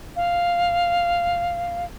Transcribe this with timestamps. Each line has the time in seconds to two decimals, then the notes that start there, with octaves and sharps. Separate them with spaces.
0.16 F5